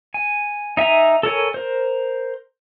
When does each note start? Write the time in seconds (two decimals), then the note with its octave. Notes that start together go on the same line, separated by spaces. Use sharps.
0.14 G#5
0.77 D#4 E5 G#5 A#5
1.23 A4 A#4 C#5 G#5
1.54 A#4 C5